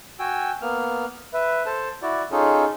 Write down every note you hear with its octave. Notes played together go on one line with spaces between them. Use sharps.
F#4 G5 G#5 E6
A#3 B3 F6
B4 E5
A4 C5 A5
E4 F#4 D5
C#4 D#4 F4 G#4 A4